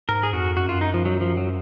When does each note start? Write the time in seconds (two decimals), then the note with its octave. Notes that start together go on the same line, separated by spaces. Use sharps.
0.09 G#2 A#4
0.23 G#4
0.33 F2 F#4
0.57 F#2 F#4
0.69 F4
0.81 D#4
0.94 F3
1.05 F#3
1.21 F3
1.37 F#3